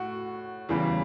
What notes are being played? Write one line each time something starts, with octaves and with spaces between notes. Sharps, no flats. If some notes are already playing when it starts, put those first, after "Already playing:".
Already playing: A2 F#4
E2 C#3 E3 G3